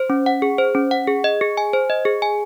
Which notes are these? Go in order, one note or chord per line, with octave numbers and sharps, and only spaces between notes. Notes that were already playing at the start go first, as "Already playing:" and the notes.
Already playing: C5
C#4
F#5
G#4
C5
C#4
F#5
G#4
D#5
G#4
G#5
C5
D#5
G#4
G#5